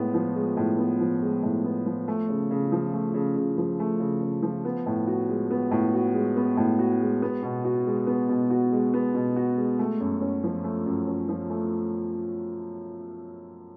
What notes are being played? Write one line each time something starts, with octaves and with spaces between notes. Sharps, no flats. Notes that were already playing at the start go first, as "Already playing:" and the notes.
Already playing: A2 G#3 B3
F3
G#3
A2
B3
F3
G#3
A2
B3
F3
A3
C#3
C#3
F3
A3
C#3
C#3
F3
A3
C#3
C#3
F3
B3
A2
F#4
G#3
B3
A2
F#4
G#3
B3
A2
F#4
G#3
B3
B2
F#4
G#3
B3
B2
F#4
G#3
B3
B2
F#4
G#3
A3
F#2
C#4
F3
A3
F#2
C#4
F3
A3